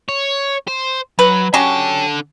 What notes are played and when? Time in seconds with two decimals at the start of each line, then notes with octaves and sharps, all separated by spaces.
0.09 C#5
0.68 C5
1.19 F#3 B4
1.54 D3 F#3 C#4 G4 A5